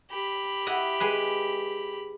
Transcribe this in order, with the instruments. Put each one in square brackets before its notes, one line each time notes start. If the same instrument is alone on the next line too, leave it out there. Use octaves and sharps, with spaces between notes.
[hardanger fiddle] G4 B5
[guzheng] E4 D#5 F#5
G#3 G#4 B4